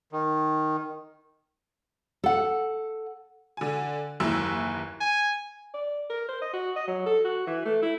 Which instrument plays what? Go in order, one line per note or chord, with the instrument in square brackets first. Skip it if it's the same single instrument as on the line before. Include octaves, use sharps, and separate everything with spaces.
[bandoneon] D#3
[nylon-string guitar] A4 F#5
[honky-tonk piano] D3 G#5
F#1 D#2 E3 E4 E6
[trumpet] G#5
[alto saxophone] D5
A#4
C5
D#5
F#4
D#5
F#3
A4
F#4
E3
A3
E4